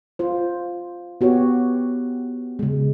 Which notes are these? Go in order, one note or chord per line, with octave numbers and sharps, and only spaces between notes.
F4 C5
B3 F#4 G4 C#5
C#3 G#3